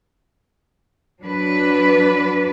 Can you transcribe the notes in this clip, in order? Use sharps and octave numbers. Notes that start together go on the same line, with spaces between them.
F#3 D4 B4